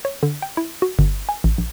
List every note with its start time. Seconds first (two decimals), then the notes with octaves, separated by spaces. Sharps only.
0.05 C#5
0.23 D3
0.42 G5
0.57 E4
0.82 F#4
0.99 G1
1.29 G#5
1.44 A1
1.58 A#1